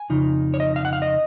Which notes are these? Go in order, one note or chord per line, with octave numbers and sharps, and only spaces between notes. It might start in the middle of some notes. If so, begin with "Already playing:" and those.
Already playing: G#5
F2 C#3 D#4
C#5
D#5
F5
F#5
F5
D#5